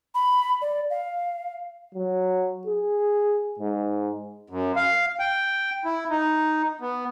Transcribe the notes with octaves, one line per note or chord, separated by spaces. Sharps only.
B5
D5
F5
F#3
G#4
G#2
F#2
F5
G5
E4
D#4
B3